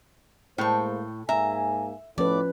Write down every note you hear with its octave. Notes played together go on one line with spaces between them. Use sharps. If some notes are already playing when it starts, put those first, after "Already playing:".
A2 G#3 A#3 C5 G5 C#6
G#2 A#3 E5 G#5 A#5
A2 F3 C#4 B4 D5